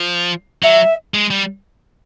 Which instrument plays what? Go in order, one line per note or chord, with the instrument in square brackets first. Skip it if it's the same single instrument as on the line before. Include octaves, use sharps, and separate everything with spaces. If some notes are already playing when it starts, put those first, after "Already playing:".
Already playing: [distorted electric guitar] F3
[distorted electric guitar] F#3 [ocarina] E5
[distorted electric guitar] G#3
G3